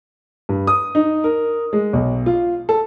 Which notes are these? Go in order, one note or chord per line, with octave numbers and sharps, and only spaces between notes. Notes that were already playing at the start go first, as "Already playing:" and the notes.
G2
D#6
D#4
A#4
G#3
B1
F4
A4